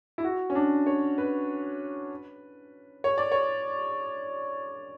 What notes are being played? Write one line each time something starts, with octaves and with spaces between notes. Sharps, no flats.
E4
F#4
C#4
D4
C#5
B4
C#5
D5
C#5